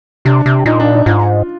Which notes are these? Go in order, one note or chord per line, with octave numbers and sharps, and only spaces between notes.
C3 D4
C3
A#2 D#4
D4
D#4
G#2 F4